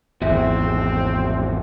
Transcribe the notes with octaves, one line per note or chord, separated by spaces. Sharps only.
G#1 E2 C4 F#4 E5